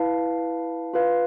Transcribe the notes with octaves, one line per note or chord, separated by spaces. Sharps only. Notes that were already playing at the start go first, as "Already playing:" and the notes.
Already playing: E4 B4 F5 A5
F4 B4 F5